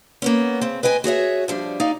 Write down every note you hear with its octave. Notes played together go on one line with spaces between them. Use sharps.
A#3 B3 C#4
C#3 C4
B4 D#5 G5 G#5
F#4 G#4 C#5 E5
F3 G3 D4
D#4 D5 F5